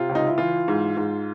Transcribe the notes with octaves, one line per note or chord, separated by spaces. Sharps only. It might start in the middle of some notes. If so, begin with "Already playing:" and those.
Already playing: C3 F4
C#2
D#4
E4
E3 F4
G#2
G#2